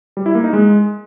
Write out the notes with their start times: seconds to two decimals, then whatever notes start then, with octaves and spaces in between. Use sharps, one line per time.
0.17 G3
0.26 E4
0.35 A#3
0.44 D#4
0.53 G#3